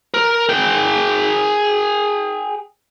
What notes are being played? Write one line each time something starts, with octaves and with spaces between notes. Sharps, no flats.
A#4
G#4 G5